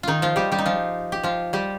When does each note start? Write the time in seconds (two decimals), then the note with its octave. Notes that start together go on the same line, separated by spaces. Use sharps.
0.03 D#3 D#4 F4
0.22 F3 F4
0.36 G3 G4
0.52 G3 G4
0.59 D#4
0.66 F3 F4
1.12 G4
1.23 F3 F4
1.53 G3 G4